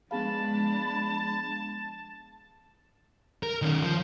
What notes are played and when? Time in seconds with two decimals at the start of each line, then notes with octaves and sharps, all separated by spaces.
0.11 F3 G#3 B3 D4 G#4 F5 A5 B5
3.43 A#4
3.62 D#3 C#4
3.82 F3